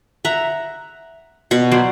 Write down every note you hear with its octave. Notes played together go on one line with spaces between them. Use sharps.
E5 F#5 A#5
B2 F#5 C#6
F#3 C5 D5